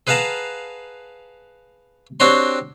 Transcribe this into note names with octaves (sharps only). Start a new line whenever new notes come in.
G#4 B4 F5 F#5 A5 A#5
C4 D4 F#4 G4 C#5 C6